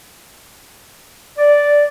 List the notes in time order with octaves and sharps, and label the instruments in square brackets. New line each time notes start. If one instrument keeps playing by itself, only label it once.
[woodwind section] D5